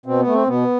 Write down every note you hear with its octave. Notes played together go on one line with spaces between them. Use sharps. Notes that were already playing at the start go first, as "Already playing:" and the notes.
B2 C4
B3
A3
C4
B2 B3